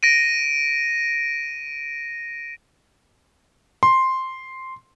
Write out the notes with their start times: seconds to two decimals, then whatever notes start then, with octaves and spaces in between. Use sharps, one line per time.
0.03 A#6 D7 D#7
3.83 C6